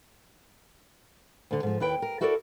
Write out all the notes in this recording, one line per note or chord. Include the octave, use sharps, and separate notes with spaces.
D2 D3
G#2 F3
D#2 E4 B4 G5
A#4
E4 F#4 A4 A#4 C5 D5